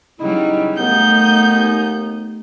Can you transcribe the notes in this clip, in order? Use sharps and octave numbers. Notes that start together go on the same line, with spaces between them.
C#3 F#3 G3 D#4 E4
D#2 A3 B3 D#4 G6